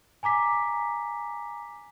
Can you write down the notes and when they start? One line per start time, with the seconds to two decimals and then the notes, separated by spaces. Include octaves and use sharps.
0.23 G#5 A#5 D6 B6